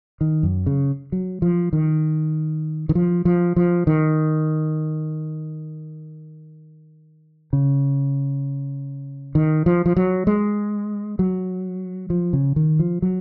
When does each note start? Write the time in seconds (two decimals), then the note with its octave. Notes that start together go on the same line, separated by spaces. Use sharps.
0.21 D#3
0.43 F#2
0.66 C#3
1.12 F#3
1.42 F3
1.73 D#3
2.89 D#3
2.95 F3
3.25 F3
3.56 F3
3.87 D#3
7.53 C#3
9.35 D#3
9.66 F3
9.86 F3
9.96 F#3
10.27 G#3
11.19 F#3
12.10 F3
12.33 C#3
12.56 D#3
12.79 F3
13.02 F#3